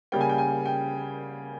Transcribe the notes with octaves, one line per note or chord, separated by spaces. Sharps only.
C#3 G3 A#3 G5
G#5
G5
G#5
G5